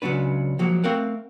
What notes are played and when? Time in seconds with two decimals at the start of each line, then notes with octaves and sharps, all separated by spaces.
0.02 C#2 C#3 F#3 D4 B4
0.59 F3 F#3 G#3 A#3
0.84 A3 C4 A#4 F5 F#5